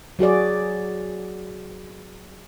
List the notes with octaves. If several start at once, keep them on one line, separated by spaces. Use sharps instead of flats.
F#3 F#4 G#4 D5